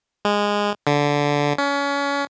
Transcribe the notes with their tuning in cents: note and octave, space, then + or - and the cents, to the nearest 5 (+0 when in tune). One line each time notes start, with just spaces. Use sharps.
G#3 -15
D3 -15
C#4 +30